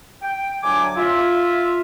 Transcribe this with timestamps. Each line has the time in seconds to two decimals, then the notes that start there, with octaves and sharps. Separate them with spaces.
0.22 G5
0.63 D2 F#3 G#5 D6
0.96 F4 E5